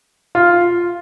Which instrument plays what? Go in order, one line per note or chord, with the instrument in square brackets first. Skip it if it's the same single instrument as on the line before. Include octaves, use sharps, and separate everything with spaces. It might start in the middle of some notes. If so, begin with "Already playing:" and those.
[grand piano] F4